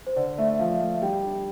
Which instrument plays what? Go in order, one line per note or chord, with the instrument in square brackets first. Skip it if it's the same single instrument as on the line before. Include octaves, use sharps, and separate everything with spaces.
[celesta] C5
[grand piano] D3 [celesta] D5
[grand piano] A3 [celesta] E5
[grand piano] F3 [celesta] F5
[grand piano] A3
[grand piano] G3 [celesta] G5
[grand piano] D4